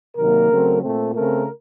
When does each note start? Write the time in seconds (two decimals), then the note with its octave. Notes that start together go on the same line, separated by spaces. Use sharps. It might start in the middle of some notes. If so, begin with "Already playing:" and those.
0.17 C3 D#3 F#3 A#3 A#4
0.50 C#3 F#3 A3 C4
0.82 A#2 A3 C4
1.15 C#3 A3 C4 A#4